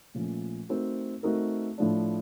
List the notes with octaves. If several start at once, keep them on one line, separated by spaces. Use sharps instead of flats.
A#2 F3 A3 C#4
A3 C4 D#4 F#4 A#4
A3 C4 D#4 F#4 A#4
A2 F3 A3 D4